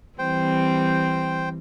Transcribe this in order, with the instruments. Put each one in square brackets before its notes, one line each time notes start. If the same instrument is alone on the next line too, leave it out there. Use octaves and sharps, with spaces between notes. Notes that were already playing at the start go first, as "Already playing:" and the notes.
[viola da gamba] E3 G3 C4 [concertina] C5 G5